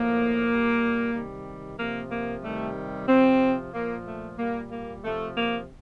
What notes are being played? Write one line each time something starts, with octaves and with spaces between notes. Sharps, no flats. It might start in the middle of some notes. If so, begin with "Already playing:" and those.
Already playing: A2 F3 A#3
A#2 G3
C3 D#3 G3
C3 F3 A#3
A#3
C3 D#3 G3 A3
C3 F3 C4
A#2 F3 A#3
A3
A#2 G3 A#3
A#3
C3 F3 A3
A#3